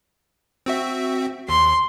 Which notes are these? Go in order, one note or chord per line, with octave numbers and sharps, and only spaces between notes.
C4 F#4 E5
D#2 C6